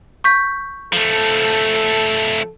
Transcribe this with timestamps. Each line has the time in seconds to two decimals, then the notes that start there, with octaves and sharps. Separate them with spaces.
0.24 C#6 G6 B6
0.93 F3 A3 A4